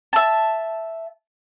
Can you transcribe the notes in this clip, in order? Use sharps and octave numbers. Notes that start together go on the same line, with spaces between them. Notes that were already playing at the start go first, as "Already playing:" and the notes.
E5 A5